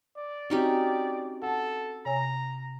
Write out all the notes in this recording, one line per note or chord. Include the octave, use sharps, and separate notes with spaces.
D5
C4 C#4 D#4 F#4 G4
A4 F#5 A5
C3 C#5 G#5 A#5